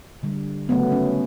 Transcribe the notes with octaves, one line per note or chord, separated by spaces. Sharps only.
D3 G3
C#3 F#3 A3 B3
C#4